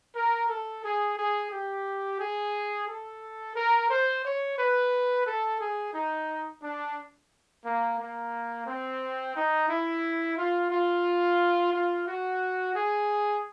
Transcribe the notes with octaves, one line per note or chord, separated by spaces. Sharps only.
A#4
A4
G#4
G#4
G4
G#4
A4
A#4
C5
C#5
B4
A4
G#4
D#4
D4
A#3
A#3
C4
D#4
E4
F4
F4
F4
F#4
G#4